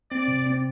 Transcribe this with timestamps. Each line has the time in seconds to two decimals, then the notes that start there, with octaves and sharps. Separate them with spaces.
0.11 C4 D5
0.28 C3
0.47 C4